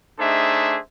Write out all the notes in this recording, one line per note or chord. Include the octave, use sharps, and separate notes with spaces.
A3 D4 D#4 G#4 C5 E5